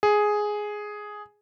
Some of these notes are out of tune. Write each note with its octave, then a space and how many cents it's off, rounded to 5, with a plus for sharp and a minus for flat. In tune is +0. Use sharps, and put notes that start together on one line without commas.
G#4 +5